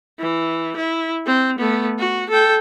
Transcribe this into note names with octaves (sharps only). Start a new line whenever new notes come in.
E3
E4
C4
A3 B3
F#4
A4 G5